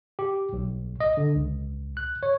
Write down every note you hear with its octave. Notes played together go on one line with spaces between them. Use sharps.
G4
B1
D#5
D3
C#2
F#6
C#5